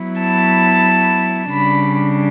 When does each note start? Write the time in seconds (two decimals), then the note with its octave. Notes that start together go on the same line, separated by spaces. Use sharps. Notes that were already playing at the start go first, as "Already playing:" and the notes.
Already playing: F#3 B3 E4
0.21 A5
1.52 C#3 G3 D4 B5